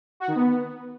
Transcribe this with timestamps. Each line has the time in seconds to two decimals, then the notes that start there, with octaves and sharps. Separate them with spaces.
0.20 F#4
0.28 D#3
0.36 B3